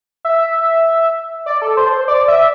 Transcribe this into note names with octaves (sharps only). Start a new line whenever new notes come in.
E5
D5
A4
C5
C5
D5
E5